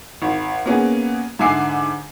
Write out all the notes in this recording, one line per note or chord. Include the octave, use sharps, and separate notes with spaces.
G#1
A#3 B3 C#4 G#4
G#2 D3 E5 G#5 D6 C7